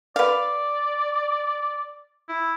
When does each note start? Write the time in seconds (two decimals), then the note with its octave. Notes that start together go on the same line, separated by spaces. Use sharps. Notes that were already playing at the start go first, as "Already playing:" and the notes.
0.16 B4 D5 F5
2.29 E4